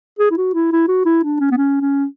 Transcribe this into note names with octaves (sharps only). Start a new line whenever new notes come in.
G#4
E4
F#4
E4
E4
F#4
E4
D4
C#4
B3
C#4
C#4